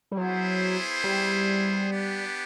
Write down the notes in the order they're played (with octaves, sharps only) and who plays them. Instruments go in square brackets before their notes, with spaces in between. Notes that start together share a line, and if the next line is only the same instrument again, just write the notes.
[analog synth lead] G3
[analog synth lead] F#3 [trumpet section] B3 E4 G#4 C5
[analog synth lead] G3
[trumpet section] B3 D4 G4